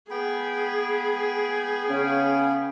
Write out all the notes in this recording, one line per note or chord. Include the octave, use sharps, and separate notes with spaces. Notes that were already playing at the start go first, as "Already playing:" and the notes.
B3 G#4 G5 B5
C#3 C#4